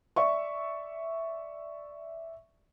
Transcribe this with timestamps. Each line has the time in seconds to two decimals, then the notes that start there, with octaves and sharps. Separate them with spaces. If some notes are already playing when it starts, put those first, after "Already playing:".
0.16 D5 E5 C#6